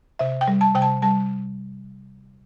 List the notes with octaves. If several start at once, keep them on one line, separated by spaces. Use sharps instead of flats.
C3 E5
G5
G3
A5
C3 G5
A5
G3 A5